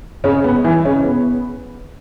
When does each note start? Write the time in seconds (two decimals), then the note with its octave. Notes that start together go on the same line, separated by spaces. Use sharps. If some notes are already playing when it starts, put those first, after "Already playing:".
0.24 C#3 C#4
0.44 B3
0.64 E3 E4
0.85 C#3 C#4
1.04 B3